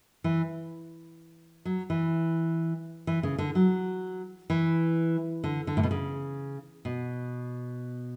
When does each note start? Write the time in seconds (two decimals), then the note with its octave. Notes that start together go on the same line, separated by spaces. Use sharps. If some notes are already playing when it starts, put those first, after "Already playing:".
0.24 E3
1.65 F#3
1.90 E3
3.07 E3
3.23 C#3
3.38 D3
3.55 F#3
4.50 E3
5.44 D3
5.67 D3
5.77 A2
5.83 B2
5.91 C#3
6.85 B2